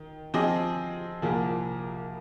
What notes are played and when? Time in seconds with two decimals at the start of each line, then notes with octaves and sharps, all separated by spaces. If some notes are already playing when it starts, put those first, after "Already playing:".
Already playing: D#3
0.34 F3 C4 G#4 D#5
1.22 C2 A#2 F3 A#3 G#4